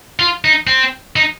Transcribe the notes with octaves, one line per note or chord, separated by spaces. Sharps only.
F4
D#4
C4
D#4